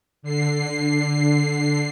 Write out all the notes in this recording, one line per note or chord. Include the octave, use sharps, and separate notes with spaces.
D3 C7